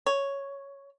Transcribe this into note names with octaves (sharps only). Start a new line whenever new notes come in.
C#5